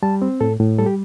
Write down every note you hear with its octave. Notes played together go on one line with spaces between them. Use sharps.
G3 A5
C4
A2 A4
A2
G3 A4
G4